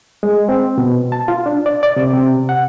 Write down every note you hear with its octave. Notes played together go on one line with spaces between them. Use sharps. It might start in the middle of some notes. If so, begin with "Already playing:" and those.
G#3
C4
B2
A5
F4
D4
D5
D5
C3
C3
F#5